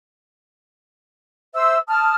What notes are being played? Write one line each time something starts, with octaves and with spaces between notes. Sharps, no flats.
C5 E5 E6
A5 D#6 F6